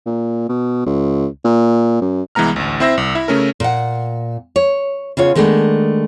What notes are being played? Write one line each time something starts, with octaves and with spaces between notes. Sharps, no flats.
A#2
B2
C#2
A#2
F#2
C2 E3 G#3 B3 A#5 F6
A1 D2
C4 E4 C5 E5 E6 A#6
C2
E4 E5
C#3 A3 C#4 A#4
A#2 F#5
C#5
C#3 B3 F4 C#5
D#3 G#3 A3 B3 D4